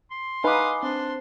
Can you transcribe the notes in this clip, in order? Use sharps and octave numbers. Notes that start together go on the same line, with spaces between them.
C6
D#4 B4 F5 G#5 B5 D6 D#6
C4 D4 C5 C6